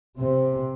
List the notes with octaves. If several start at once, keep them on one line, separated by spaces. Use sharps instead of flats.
C3